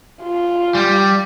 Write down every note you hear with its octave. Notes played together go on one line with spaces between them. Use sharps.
F4
G3